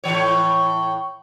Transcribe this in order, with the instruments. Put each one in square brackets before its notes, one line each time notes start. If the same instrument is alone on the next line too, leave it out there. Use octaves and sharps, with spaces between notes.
[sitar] A2 E3 C#5